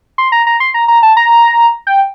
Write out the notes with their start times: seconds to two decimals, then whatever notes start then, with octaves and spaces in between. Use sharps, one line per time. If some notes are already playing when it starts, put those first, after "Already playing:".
0.18 C6
0.32 A#5
0.47 A#5
0.60 C6
0.74 A#5
0.88 A#5
1.03 A5
1.17 A#5
1.87 G5